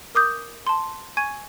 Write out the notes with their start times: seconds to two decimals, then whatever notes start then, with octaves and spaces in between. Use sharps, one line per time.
0.15 A#4 D6 D#6 G6
0.67 A5 C6
1.17 G#5 C#6 G#6 D#7